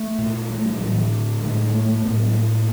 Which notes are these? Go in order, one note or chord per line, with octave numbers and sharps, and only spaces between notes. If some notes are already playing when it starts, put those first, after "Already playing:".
Already playing: A3
A#2
A3
G3
A2 F#3
E3
D3
A2 G#3
G#3
A3
A3
A2 B3
F#3
G3
A#3